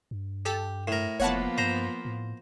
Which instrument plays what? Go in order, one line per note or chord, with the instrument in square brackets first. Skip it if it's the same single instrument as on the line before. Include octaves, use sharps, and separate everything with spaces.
[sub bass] G2
[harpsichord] G4 [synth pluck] A4
[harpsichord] A2 A#4
[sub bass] F1 [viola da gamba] F3 A#3 B3 [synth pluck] C#5 F#5 A5
[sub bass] G2 [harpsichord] C5 A#5
[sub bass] A2